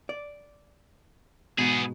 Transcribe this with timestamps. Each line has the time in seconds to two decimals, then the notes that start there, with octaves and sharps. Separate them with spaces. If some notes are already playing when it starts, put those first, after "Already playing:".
0.09 D5
1.58 G#2 B2 B3 G#4